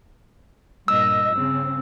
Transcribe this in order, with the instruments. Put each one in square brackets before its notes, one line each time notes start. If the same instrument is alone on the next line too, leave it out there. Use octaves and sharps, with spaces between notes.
[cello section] G2 A#2 D#5 [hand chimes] E6
[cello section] C#3 C4